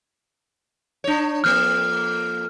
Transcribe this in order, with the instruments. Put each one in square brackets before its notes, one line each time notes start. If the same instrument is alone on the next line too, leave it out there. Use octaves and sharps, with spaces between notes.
[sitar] D4 C#5
[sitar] F2 A#3 [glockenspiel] F6